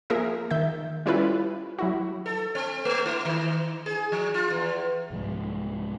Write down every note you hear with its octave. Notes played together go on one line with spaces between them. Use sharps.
F3 A#3 G#4 A#4 E5
D#3 E5 G6
G3 C#4 E4 F4 A4 B4
F#3 E4 F#4
A4
C4
A3
E4
D#3
G#4
F3
F4
E2
C2 G#2 F3 G#3